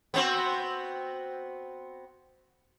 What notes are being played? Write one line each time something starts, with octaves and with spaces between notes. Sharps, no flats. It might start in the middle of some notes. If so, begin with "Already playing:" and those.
B3 C4 F#4